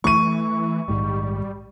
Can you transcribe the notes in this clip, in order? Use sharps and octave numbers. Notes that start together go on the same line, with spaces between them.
E3 A3 C#6 D#7
A#1 G#2 D#3 G3